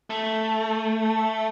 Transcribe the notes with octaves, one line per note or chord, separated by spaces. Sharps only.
A3